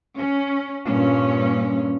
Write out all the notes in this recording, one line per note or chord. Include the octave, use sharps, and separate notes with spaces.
C#4
G2 A#2 C#4